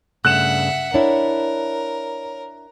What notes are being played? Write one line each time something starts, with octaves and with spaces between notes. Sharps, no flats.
G2 C#3 A3 E5 F#5 F#6 E7
D4 E4 A#4 C#5